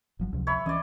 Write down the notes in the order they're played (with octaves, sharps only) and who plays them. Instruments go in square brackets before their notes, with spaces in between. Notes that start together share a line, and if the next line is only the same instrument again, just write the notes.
[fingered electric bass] G1 F3 F#3
C#2 C3 F3
[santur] C#5 E5 B5
[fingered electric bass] E3 C#4 [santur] D5 D#5